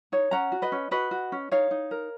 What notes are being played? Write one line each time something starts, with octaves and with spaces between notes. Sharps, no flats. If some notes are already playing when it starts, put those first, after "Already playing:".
D#4 C#5
C#4 F#5 A#5
F#4
B4 D#5
C#4
F#4 B4 D#5
F#4
C#4
D#4 C#5 F5
D#4
A#4